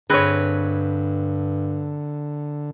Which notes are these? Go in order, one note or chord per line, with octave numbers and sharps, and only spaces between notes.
G2 D3 C4 G#4 B4 C#5 D#5